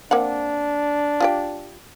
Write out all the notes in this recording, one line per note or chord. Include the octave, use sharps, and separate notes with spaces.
A#3 C4 D4 F#5
F4 G4 G5